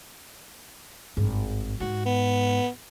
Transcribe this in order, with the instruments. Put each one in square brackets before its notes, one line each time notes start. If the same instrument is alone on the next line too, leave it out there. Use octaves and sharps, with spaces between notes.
[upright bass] G#1 G2
[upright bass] G#2 [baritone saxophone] F#4
[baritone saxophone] B3